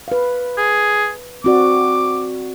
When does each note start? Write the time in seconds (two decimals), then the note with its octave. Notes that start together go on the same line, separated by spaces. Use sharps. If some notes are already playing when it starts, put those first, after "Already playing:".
0.08 B4 F5
0.58 G#4
1.44 C4 F#4 D5 D6